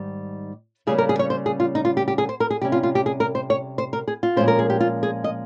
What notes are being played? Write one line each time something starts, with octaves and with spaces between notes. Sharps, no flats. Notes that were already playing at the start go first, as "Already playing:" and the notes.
Already playing: G#2 D#3 G3
C#3 G3 A#3 C#4 G#4
A#4
G#4
C#5
C5
G#4
F4
D#4
F4
G4
G4
G#4
C5
A#4
G#4
C3 G3 C#4 G4
F4
F4
G4
G#4
A#4
C5
C#5
C5
A#4
G#4
F4
A#2 F3 G#3 C#4 C5
A#4
G#4
G4
F4
G#4
D#5